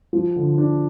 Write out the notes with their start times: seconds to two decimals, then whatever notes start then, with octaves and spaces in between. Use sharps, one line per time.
0.13 F3
0.36 D3
0.58 D4